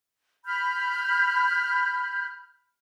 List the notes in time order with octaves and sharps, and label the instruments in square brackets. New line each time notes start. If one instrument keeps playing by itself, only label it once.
[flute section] B5 F6 G6